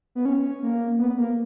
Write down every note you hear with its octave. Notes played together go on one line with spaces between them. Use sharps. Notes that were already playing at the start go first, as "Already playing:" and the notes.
B3
C#4
A#3
B3
A#3